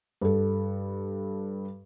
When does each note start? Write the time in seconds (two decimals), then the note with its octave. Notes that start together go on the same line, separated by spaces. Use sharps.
0.21 G2 A4